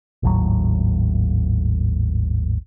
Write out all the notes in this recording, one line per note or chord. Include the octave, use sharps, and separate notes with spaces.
G#1 D#2 A2 F#3